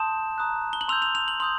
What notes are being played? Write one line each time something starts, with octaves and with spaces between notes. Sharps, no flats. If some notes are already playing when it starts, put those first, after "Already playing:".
Already playing: A5 C6 D#6 G6 E7
A#5 D#6 F#6
G7
F#7
C6 E6 G6 F7
F7
F7
F#7
C6 D#6 G6 F#7